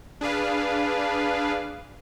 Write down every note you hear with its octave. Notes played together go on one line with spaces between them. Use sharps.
D4 G#4 B4 F5